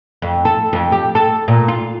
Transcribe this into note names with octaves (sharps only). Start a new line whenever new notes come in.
F2
A4
F2
G4
A4
A#2
F4